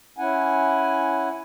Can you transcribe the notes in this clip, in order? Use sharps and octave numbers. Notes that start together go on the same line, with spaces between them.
C#4 E4 F#5 G#5